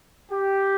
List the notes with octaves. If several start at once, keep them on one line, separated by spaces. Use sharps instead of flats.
G4